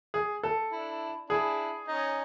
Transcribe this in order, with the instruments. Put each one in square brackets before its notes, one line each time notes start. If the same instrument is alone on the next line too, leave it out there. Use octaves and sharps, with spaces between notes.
[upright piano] G#4
A4
[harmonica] D4 E4
[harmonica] D4 E4 [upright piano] G#4
[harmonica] C#4 D#4